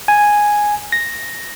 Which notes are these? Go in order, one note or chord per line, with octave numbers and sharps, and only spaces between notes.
G#5
A#6